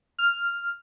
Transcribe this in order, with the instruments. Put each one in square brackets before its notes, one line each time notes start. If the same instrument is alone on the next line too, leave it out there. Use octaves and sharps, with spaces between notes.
[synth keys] F6